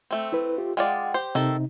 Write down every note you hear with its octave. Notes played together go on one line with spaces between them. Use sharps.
A3 C4
E4 B4
F4 G4
G#3 F4 D5 F#5 G5
G4 C5
C3 D#3 D#4 A4